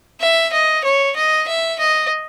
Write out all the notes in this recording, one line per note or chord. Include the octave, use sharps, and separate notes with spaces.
E5
D#5
C#5
D#5
E5
D#5